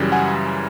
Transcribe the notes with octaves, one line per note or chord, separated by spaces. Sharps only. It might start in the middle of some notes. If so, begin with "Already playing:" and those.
Already playing: F#2 C#3 E3 G3
F#5 G#5